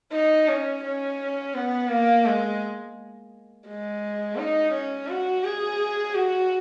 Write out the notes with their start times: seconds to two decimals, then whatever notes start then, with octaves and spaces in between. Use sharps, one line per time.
0.13 D#4
0.49 C#4
0.84 C#4
1.55 B3
1.90 A#3
2.25 G#3
3.67 G#3
4.37 D#4
4.73 C#4
5.08 F#4
5.44 G#4
6.15 F#4